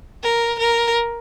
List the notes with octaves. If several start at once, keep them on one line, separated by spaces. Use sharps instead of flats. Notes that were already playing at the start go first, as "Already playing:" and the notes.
A#4
A#4